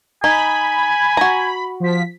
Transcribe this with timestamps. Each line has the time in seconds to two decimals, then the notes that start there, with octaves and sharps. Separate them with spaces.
0.24 D#4 G#5 B5
1.17 F#4 A#5
1.80 F3 B6